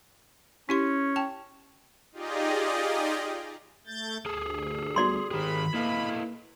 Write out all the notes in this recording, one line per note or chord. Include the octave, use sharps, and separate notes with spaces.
C#4 E4 G4 C6
G5 A5
D#4 F4 G4 G#4 D5 D#5
A3 G6 A6
D2 G#4 A4
G3 B3 F#4 D5 C6
D#3 G4 G#4 A#4 C5 B5
A#3 E4 A4 B4 D#5 F5